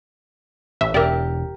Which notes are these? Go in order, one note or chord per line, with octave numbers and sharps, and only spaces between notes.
A1 E5
E1 G4 A#4 D5 E5